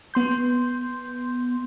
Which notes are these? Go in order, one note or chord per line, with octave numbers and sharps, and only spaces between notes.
B3 C6 G6